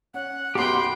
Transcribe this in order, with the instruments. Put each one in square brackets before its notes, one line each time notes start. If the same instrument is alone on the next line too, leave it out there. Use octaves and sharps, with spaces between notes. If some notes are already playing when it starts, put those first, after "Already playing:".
[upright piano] C#4 [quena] F#5
[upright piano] B1 F#2 [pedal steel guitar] G4 C6 [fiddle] B4 G5